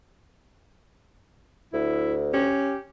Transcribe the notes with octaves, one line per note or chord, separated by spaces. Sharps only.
D2 E4
C#4 G4